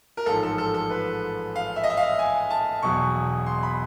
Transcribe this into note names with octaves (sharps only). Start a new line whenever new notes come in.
A#4
A1 G#2 F3 A4
A4
A4
A4
B4
F5
E5
D#5
E5
F5
G#5
A5
E1 E2 B2 F#3 C#6
C6
B5